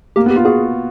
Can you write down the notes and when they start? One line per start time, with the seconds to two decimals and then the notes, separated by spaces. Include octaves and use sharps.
0.16 A#3 G4
0.26 B3
0.31 G4
0.36 F4
0.45 F#4 G#4